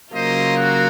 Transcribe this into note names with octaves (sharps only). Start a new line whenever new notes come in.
C#3 F#3 A#3 F4 C5 D#5
F#4